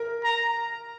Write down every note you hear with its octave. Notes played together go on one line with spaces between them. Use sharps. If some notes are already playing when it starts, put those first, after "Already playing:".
Already playing: A#4
A#5